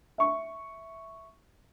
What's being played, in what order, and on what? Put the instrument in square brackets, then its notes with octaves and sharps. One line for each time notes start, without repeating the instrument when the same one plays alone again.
[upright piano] E5 C#6